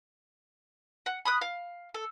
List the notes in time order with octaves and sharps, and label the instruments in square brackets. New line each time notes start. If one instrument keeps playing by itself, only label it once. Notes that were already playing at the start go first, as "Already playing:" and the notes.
[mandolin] F#5
B5 D#6 F#6
F5
A4